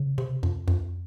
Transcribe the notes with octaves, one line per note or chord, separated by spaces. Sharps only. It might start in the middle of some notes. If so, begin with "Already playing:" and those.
Already playing: C#3
C3
F2
F2